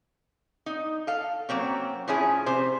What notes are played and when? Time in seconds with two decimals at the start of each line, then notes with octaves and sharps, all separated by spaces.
0.66 D#4
1.07 A4 F5
1.49 F#3 A#3 C4 C#4
2.08 A2 F3 C#4 E4 G#4
2.46 C3 C5